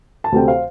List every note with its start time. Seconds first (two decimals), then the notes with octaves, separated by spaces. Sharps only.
0.24 A5
0.32 D2 C3 A3 C4 G5
0.48 C5 F5